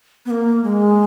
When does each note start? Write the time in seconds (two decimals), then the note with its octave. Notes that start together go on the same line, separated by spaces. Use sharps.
0.26 B3
0.31 A#3
0.64 G#3